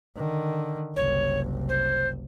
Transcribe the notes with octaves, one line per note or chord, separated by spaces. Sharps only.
D3 D#3
F#1 C2 C#5
C5